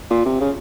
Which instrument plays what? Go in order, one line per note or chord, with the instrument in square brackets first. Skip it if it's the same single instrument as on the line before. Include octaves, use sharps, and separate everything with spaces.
[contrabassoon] A#2
C3
C#3